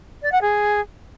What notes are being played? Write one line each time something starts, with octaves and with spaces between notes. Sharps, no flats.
D5
F#5
G#4